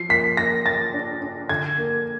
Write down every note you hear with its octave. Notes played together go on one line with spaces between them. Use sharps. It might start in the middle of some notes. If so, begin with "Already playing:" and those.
Already playing: F3 C7
A#3 B6
A#3 A#6
A#3 A6
D4
D4
D3 G#6
A#3